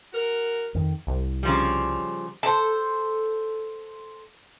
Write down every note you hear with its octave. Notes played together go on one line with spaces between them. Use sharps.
F#4 A#4
F2 D#3
C2
C#3 F3 G3
A4 C5